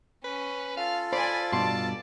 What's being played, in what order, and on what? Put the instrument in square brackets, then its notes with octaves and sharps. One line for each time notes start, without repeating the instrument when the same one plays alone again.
[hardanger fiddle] C#4 [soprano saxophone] B4
[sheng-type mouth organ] F4 A4 [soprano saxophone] F5
[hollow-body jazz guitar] C5 [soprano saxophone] D5 [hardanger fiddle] G#5 B5
[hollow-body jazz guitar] G2 B2 C6 [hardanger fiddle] D5 [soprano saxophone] A5